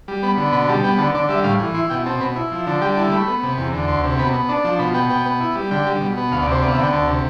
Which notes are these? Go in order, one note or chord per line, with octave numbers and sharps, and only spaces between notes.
G3
B3 B5
D3
B2 B5
G3 A5
B3 G5
D3 A5
D3 D5
G3 E5
A2 F5
E3
E4 C6
B2 G5
C4 A5
B2 B5
E4
F3
D3 A5
G3 G5
E4 A5
A3 B5
B3
C3
E2
D3
D2 C6
C3
B2 B5
B3
D4 A5
F3 A5
B2 B5
B3 G5
B2 G5
B3
E4
G3
D3 G5
G3
B2
B3
D2 F5
D5
C3 C5
B3 D5
F5
E5
D3 G5
D2 A5
C3